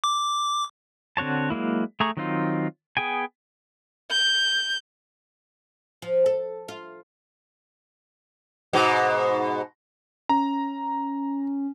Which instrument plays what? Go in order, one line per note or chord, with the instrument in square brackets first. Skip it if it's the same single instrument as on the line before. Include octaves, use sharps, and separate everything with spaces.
[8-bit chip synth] D6
[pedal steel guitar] D3 C4 F#4 C#5 A5
F#3 G#3 A#3 E4
A3 G#4 A#5 C#6
D#3 F#3 C4 D#4 F4
B3 G#4 G5 G#5
[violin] G6
[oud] F3
A4
F4
[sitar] G#2 B2
[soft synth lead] C#4 [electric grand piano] A#5